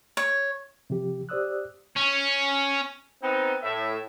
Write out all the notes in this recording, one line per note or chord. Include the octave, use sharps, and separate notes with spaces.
C#5
C3 F3 G4
G4 C5 D5 D#6 E6 F#6
C#4
B3 C4 D#4
A2 E5